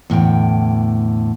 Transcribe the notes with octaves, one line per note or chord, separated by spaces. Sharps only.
E2 A2 D3 G5